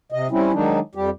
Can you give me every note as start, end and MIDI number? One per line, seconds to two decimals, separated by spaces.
0.12 0.28 48
0.12 0.28 75
0.31 0.52 55
0.31 0.52 60
0.31 0.52 61
0.31 0.52 64
0.53 0.79 51
0.53 0.79 54
0.53 0.79 56
0.53 0.79 62
0.53 0.79 63
0.95 1.10 41
0.95 1.10 55
0.95 1.10 67